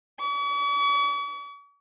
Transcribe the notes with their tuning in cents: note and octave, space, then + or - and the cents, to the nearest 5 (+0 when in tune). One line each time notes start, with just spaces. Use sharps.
C#6 +45